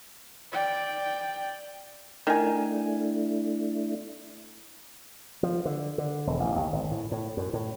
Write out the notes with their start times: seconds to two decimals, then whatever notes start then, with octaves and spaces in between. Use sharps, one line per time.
0.52 D5 G5
2.27 D#3 A3 D4 E4 G#5
5.43 F3
5.65 D3
5.98 D3
6.27 E1
6.40 A1
6.56 D#2
6.73 G#1
6.91 A2
7.12 A2
7.37 F#2
7.53 A2